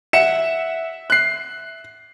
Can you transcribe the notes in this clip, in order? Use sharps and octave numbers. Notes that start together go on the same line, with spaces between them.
E5 F#5 C#7 E7
F#6 C7